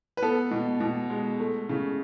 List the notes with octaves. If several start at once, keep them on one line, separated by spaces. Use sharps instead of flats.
B4
B3 A4
B2
B2
G#3
A3
C#3